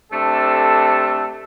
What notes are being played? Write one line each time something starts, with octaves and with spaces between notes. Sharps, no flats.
C3 A3 D4 A4